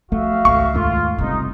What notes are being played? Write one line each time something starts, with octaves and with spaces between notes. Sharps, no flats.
F3 A3 F#4 E5 F5
G#1 C#2 A3 C#6
D#2 G#2 A3 F4
F#1 C2 C3 G#3 A3 D#4